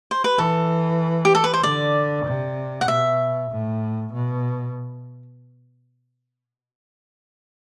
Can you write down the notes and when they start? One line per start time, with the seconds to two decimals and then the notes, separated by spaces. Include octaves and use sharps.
0.11 C5
0.24 B4
0.38 E3 A4
1.25 G4
1.35 A4
1.44 B4
1.54 C5
1.63 D3 D5
2.25 C3
2.81 F#5
2.88 B2 E5
3.51 A2
4.13 B2